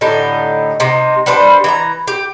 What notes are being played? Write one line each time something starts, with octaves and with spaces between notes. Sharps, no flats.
A2 D3 D#4 G4
C3 D#4
G3 D4 B4 C5
E3 E5 A#5
G4